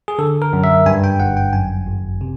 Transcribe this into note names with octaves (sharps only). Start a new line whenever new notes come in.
G#4
D3 A4
A#4
F#2
E5
G2 G#5
G5
G1 F#5
G5
F#2 G#5
G#1
C3